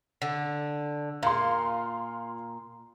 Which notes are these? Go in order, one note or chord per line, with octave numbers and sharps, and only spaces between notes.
D3
A#2 F5 C6